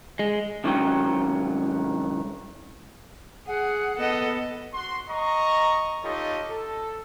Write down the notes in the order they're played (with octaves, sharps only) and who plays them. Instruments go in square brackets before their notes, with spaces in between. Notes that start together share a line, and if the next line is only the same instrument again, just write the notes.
[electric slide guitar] G#3
[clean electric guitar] C2 G#2 D#3 F#3 C#4 G5
[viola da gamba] G#4 [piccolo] F#5
[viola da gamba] B3 A4 D#5
[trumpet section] F#4 C6
D#5 A#5 C#6
D#4 F4 G4 A4 C#5 D#5
A4